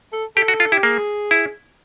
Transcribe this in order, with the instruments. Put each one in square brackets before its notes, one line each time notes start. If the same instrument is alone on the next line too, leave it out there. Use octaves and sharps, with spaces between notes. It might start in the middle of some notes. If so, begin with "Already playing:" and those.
[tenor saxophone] A4
[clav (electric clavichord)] G4 [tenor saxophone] A4
[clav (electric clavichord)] F#4
F4
[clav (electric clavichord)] E4 [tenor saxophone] G4
[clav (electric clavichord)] A#3 [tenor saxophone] G#4
[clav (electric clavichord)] E4